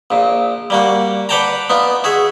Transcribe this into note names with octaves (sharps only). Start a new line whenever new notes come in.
A#1 A#2
G3 A#3 F#4
B4 D5 F#5 G5 A5 A#5
B3 D#4 F4
F#4 G#4 E5